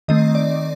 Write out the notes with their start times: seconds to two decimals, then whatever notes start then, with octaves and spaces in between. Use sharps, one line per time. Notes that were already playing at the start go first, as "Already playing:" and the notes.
0.08 D#3 A3 C4 D#5
0.35 D5